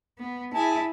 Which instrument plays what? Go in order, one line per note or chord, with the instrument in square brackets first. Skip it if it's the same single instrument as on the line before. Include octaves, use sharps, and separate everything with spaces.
[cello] B3
[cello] E4 [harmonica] G#4 G#5 A5